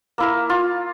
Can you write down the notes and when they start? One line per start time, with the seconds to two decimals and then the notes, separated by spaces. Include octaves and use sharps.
0.18 A#3 E4 A#4
0.50 F4